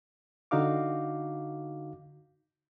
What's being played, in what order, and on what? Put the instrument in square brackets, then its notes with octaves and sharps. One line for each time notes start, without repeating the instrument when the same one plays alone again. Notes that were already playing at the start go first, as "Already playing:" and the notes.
[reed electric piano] D3 D#4 F#4 F5 D6